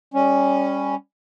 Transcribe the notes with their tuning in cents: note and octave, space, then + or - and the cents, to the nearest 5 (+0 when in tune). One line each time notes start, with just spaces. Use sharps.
G3 +20 C#4 +0